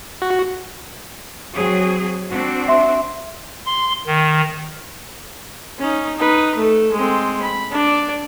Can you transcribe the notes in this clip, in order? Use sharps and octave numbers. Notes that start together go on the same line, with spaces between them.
F#4
F#3 C4 G#4
C4 D4 F#4
E5 C6
C6
D#3
C#4 D#4
D#4 B4
A3 A4
G#3 C4
B5
D4 D5